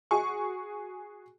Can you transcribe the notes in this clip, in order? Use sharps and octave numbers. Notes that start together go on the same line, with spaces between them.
F#4 G#4 G#5 C#6